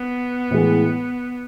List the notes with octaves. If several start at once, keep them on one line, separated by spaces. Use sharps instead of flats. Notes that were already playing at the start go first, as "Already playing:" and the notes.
Already playing: B3
A2 E3 G#3